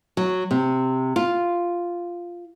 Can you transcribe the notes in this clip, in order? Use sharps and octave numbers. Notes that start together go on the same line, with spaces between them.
F#3
C3
F4